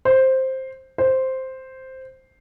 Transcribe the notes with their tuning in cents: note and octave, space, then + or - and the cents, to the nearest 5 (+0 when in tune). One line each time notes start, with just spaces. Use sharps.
C5 +5
C5 +0